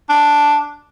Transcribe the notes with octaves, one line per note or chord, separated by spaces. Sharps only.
D4